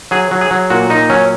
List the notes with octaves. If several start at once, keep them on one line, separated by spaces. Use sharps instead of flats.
F#3 G#4
F#3
G#4
F#3
A#2 F#4
A#2 D#4
F#3 C#4